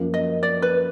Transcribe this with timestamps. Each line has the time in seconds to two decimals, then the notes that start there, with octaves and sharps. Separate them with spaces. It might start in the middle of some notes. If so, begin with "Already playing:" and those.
Already playing: F#2 F3 A#3
0.14 D#5
0.43 D5
0.62 B4